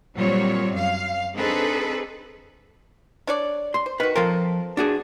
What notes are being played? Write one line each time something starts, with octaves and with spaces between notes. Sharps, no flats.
A#2 F#3 G3 C4 C#5
F#2 F5
C4 D4 D#4 G#4 A4 B4
D4 C#5 D5
C6
C5
D#3 F#4 B4
F3 C4 F4 A4 A#4
D4 F#4 G#4